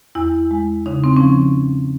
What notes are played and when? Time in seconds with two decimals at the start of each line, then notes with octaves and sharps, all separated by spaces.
0.15 E2 E4
0.51 G#3
0.86 C#3 D#4
1.04 C4
1.16 F3 C#4